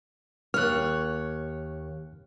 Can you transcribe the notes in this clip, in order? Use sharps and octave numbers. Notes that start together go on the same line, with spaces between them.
D#2 C#5 F6 F#6